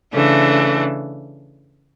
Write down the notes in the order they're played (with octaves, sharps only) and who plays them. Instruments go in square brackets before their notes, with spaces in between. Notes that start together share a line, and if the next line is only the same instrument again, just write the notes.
[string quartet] C#3 E3 A3 D4